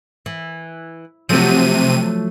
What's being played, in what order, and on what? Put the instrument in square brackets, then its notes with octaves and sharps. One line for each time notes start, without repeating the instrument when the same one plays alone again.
[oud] E3
[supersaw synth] C3 D#7 [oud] F3 F#3 A3